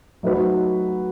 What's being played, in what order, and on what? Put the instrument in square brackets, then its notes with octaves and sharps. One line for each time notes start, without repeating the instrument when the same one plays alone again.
[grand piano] F#3 A3 D#4 F#4 B4